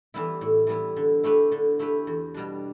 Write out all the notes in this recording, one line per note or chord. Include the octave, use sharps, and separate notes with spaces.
E3 G3 B3 E4
A2
E3 G3 B3 E4
D3
A3 E4 G4 B4
D3
A3 E4 G4 B4
E2
B2 G3 D4